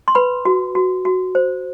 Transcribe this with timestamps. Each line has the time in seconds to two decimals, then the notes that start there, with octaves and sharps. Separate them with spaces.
0.08 C6
0.15 B4 B5
0.45 F#4
0.75 F#4
1.05 F#4
1.35 C5